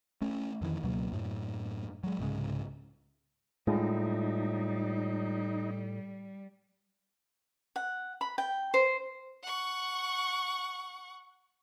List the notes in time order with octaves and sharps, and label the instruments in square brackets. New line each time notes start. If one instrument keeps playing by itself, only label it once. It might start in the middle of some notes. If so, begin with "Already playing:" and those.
[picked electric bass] A3 C#4
F2 D#3 E3
C#2 B2 F#3 A#3
F#2 A2
F#3 G#3
C2 G#2 C#3 G#3
[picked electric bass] A2 [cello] G3 [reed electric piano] G#3 F4 [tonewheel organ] D#4
[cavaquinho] F#5
B5
G5
C5
[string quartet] F#5 C#6